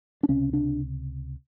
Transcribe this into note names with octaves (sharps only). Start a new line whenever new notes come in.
D4
C#2 C3 C#4
D4